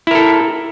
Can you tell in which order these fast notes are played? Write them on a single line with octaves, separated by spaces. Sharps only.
E4 A#4 A4